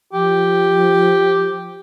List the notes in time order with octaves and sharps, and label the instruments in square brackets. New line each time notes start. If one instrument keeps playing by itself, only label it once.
[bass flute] F3 [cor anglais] G4